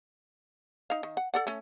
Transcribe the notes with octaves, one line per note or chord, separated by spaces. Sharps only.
D#4 F5
D#3
F#5
A4 D5 F#5
A3 C#4